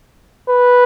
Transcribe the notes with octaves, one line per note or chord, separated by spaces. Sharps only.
B4